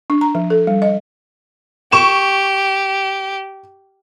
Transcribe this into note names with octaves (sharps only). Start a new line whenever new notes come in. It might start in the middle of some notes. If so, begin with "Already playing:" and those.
D4
A#5
F3
A4
G3
D#5
G4 C#6 E7